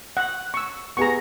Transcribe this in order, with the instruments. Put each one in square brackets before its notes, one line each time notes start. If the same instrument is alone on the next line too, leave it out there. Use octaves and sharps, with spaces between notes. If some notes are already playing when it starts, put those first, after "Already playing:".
[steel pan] F#5
C#6 E6
[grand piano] B3 G#4 [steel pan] A#5 C#6